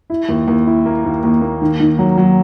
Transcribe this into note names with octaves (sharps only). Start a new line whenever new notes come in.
E4
D#2
D#2
E4
A#3
D#2
D#2
A#3
D#3
D#3
F#3
F#3